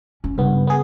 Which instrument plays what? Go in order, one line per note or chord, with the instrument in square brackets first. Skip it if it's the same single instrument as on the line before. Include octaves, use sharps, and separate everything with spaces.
[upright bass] C#4
[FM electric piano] G2 B3 [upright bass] C#3
[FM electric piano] B3 G#4